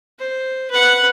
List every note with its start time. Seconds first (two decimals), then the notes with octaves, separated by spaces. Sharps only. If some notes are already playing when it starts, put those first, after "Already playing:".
0.19 C5
0.70 B4 F#5